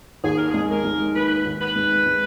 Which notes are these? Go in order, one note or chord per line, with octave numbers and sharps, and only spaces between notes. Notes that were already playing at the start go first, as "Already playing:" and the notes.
D#2 G#4
A#4
G#3 G#4
A#4
G#3
D#3 B4
D#2
B4
G#3
G#3